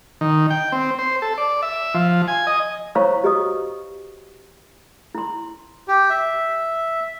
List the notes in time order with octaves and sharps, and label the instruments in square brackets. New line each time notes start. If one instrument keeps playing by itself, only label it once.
[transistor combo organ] D#3
G5
C4
C5
A4
D5
E5
F3
G#5
D#5
[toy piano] E4 C5 C#5 F5 A#5 C#6
F#4 G4 B4 D#5 C#6 D#6
E4 C6
[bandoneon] G4
E5